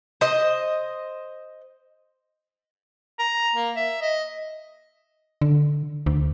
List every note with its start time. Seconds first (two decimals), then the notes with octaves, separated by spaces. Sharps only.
0.21 C5 D#5
3.19 A#5
3.55 A#3
3.76 E5
4.01 D#5
5.41 D3
6.06 D2